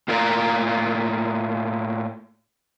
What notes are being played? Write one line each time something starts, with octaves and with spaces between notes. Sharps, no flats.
A2 A#3 F4 A#4 D5 A#5